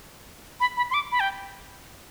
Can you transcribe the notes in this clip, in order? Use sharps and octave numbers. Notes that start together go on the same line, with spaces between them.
B5
B5
C6
D6
B5
G5